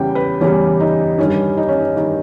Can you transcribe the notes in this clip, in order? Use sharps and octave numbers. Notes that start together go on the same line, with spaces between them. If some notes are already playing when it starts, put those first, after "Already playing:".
Already playing: E2 C#3 E3 G3 G5
B4
E2 C#3 E3 G3 C#4
D#4
G2 D#3 G3 C#4
D#4
C#4
D#4
D#3 G3